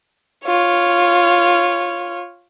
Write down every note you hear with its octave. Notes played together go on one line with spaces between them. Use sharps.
F4 C#5